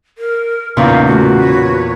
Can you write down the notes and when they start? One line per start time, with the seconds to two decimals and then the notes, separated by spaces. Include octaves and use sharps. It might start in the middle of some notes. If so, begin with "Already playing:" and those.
0.18 A#4
0.77 E2 A#2 C#3 D#4 E4 F5
1.06 A2 A3 F#4
1.42 B4 C#5